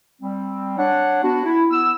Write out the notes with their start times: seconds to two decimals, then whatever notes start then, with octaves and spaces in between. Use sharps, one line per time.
0.22 G3 C4
0.78 D4 C#5 F#5
1.23 B3 D4 F#4
1.45 E4
1.71 B3 E6